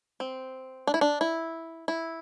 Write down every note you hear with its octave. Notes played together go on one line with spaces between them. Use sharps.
C4
D4
E4
D4
E4
E4